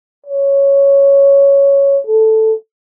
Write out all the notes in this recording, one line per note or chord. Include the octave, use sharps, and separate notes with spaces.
C#5
A4